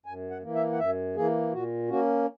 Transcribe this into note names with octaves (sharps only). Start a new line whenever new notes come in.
F#2 G#5
F#5
E3 A#3
E5
F#5
F#2 E5
E3 A#3 G#4
A#2 F#4
A#3 C#4 F#4